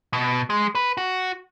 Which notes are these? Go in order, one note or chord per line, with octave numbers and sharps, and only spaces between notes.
B2
G#3
B4
F#4